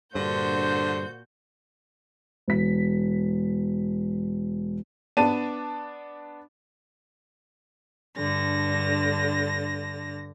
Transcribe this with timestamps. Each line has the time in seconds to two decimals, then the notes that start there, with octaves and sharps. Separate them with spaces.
0.15 G2 A#2 D3 F#4 C5 G6
2.48 E1 B6
5.17 B3 D4 D5 A5 D#7
8.16 G2 D3 A#6